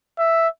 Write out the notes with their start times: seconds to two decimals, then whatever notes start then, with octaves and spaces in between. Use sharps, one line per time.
0.18 E5